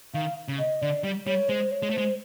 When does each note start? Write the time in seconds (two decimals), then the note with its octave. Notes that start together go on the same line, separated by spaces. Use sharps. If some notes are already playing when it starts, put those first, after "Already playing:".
0.14 D#3 F5
0.48 C#3
0.59 D#5
0.82 D3 D5
1.04 G3
1.26 G3 C#5
1.49 G#3 C5
1.71 C#5
1.82 G#3
1.90 A3
1.93 G#3 C5